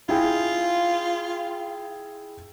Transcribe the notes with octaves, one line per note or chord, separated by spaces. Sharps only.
E4 F4 G#4 G5